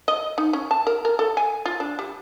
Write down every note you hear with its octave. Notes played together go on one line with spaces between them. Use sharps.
D#5
D#4
C#4
A5
A#4
A#4
A4
G#5
F4
D4
G3